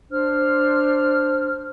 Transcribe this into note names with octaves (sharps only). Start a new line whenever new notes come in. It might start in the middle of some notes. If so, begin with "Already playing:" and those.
D4 C5 F6